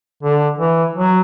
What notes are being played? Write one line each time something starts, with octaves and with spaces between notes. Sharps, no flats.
D3
E3
F#3